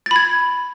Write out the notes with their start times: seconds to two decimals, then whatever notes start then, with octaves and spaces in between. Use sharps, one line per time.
0.06 A6
0.11 B5
0.16 G#6